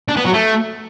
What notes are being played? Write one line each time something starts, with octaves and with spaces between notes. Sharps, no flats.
D4
B3
F#3
A3